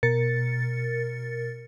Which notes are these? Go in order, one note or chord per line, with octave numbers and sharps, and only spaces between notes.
B2 A#4 A6 C#7